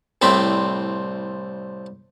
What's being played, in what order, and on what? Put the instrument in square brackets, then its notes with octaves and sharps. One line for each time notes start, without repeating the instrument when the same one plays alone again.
[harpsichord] C2 A2 C4 D5 B5